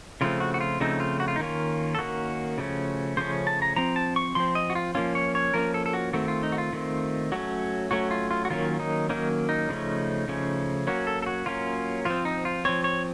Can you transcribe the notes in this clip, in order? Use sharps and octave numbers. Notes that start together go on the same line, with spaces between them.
C#3 F3 A3 C4 F4
F#4
F#4
F4
C#3 F3 A3 C4 D#4
F4
F#4
F4
D#4
D#3 A#3 C#4 F4
A4
D#3 A#3 C#4 F#4
C#3 F3 A3 C#4
C#3 F3 A3 C#4 C5
A5
A#5
F3 C4 A#5
A5
C#6
F3 C4 C6
D#5
F#4
F4
F3 A#3 C#4 F4
C#5
C#5
F3 A#3 C#4 A#4
A4
A4
F#4
D#3 A3 C4 F#4
F4
D#4
F#4
F4
D#3 A3 C4
F#3 A3 C#4 F#4
F#3 A3 C#4 F#4
F4
F4
F#4
D#3 F#3 A#3 C#4 F4
D#4
D#3 F#3 A#3 C#4 D#4
D#4
C#3 F3 A3 C#4
C#3 F3 A3 C#4
F#3 A#3 C#4 F#4
A4
A4
F#4
F#3 A#3 C#4 F4
F3 C4 F4
D#4
F4
F3 C4 C#5
C#5